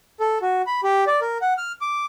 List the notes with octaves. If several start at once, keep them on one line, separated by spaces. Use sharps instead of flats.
A4
F#4
B5
G4
D5
A#4
F#5
F6
D6